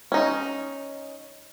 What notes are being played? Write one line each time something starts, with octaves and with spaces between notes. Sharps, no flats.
C#4 D#4